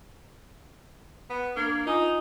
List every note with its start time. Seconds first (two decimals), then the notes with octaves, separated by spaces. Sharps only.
1.30 B3
1.56 A#3 D4 G#6 C7
1.86 D#4 F4 G#5 D#6